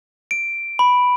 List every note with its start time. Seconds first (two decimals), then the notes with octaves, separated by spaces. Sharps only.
0.31 D7
0.79 B5